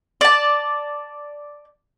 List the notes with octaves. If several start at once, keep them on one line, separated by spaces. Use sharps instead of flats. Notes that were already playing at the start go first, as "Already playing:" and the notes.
D5 A5